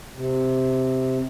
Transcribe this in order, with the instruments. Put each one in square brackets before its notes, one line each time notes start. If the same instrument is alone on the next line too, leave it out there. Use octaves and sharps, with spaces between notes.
[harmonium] C3